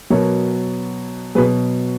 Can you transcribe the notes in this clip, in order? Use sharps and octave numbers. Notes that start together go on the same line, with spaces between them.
B2 F#3 A#4 C#5
B2 F#3 G#4 B4